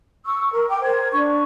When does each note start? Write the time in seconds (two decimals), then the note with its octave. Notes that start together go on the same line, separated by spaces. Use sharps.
0.25 C#6 E6
0.52 A#4
0.69 G5 D6
0.83 A#4 C5 G#6
1.12 D4 C#6